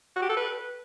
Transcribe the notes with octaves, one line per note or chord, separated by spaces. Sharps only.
F#4
G4
A4
B4